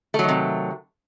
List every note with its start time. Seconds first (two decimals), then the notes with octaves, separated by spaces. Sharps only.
0.14 A3
0.19 F#3
0.24 D#3
0.29 C3